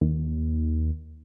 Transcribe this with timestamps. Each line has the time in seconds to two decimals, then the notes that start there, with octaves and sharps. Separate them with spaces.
0.01 D#2